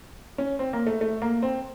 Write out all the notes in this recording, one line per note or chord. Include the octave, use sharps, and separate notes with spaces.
C#4
C4
A#3
A3
A3
A#3
C4